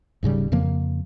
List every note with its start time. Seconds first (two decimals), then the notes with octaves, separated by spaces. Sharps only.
0.23 D#1 G#2 C#3 G3
0.52 F2 C#3 F3 A#3